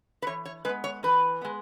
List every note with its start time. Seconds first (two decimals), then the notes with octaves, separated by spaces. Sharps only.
0.22 B4
0.27 E3 C#5
0.45 C#5
0.65 G#3 B3 B4
0.84 C#5
1.03 E3 B4
1.41 G#3 B3